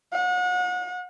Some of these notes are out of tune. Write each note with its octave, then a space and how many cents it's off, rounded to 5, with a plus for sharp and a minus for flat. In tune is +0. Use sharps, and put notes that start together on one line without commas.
F#5 -35